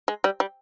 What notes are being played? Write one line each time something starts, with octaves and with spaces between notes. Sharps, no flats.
G#3
G3
G3